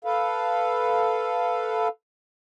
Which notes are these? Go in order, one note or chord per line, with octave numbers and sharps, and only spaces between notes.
A4 B4 F5